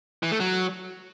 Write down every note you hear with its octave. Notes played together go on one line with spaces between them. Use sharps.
E3
A3
F#3